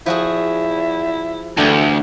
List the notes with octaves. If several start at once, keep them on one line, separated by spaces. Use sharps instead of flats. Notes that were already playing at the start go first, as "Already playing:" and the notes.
F3 E4 F#4 G#4
D2 D3 E3 G4